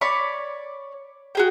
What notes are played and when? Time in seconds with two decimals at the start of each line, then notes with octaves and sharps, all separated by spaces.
0.01 C#5 D5 B5 C#6
1.35 F#4 G#4 G5